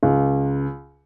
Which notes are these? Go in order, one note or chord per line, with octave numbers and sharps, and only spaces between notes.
C#2